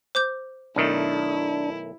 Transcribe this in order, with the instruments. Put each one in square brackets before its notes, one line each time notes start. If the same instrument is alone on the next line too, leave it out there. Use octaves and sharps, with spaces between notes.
[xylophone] C5 D6 G6
[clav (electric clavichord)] B1 D#3 A3 [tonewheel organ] D4 [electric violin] E4